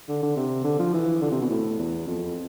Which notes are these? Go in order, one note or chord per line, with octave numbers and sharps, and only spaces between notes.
D3
D3
C3
D3
F3
E3
D3
C3
B2
A2
E2
F2